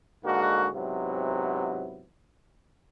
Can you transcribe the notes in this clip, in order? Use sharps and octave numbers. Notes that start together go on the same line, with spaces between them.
G#2 D3 G#3 A#3 F#4
G#2 C3 F#3 B3 C4 E4